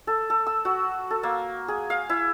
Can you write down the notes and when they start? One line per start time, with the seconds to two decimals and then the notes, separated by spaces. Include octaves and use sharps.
0.07 A4
0.30 A4
0.47 E6
0.65 F#4
1.10 A4
1.23 A#3
1.68 G#4
1.90 F5
2.09 E4